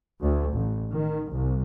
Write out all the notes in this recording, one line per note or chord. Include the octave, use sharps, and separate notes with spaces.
D2
A1
D#3
C2